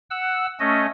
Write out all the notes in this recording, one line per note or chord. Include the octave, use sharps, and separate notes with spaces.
F#5 E6
A3 C#4 D#5